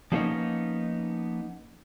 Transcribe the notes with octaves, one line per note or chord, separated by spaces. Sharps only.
F3 G3 A#3 B3 C#4 D#4